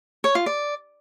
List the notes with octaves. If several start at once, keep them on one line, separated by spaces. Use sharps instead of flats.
C#5
F4
D5